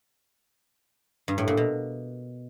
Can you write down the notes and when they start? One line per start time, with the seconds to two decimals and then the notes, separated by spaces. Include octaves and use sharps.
1.28 G2
1.38 A2
1.48 A#2
1.57 B2